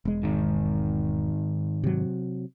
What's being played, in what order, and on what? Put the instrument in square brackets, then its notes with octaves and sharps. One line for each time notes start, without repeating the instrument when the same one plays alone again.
[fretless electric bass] E1 G#3
[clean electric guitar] G#2 D#3
[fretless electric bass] C3 F#3